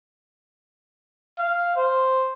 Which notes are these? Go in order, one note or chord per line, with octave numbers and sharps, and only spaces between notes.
F5
C5